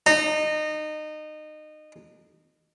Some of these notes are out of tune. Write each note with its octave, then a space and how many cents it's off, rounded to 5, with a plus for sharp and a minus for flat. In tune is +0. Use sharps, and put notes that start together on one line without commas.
D#4 -25